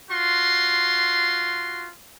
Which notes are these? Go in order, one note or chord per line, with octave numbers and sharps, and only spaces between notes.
F4 F#4 C6